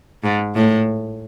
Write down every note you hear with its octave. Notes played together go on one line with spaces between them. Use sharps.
G#2
A2